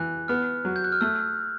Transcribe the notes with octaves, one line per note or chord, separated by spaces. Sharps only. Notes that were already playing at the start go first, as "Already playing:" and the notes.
Already playing: E3 F#6
B3 F6
F#3
G6
F#6
F6
A3 E6